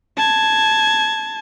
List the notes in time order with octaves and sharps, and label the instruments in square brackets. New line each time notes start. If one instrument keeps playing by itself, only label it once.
[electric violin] A5 G#6